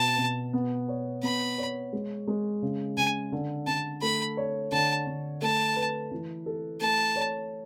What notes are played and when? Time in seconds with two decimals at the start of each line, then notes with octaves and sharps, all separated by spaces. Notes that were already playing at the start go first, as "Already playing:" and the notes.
Already playing: B2 A5
0.18 B2
0.53 B3
0.88 C#5
1.23 B3 B5
1.58 C#5
1.93 G#3
2.27 G#3
2.62 C#3
2.97 C#3 G#5
3.32 D3
3.67 D3 A5
4.02 A3 B5
4.37 C#5
4.72 D3 A5
5.07 D3
5.42 A3 A5
5.76 B4
6.12 E3
6.46 A4
6.81 A3 A5
7.16 C#5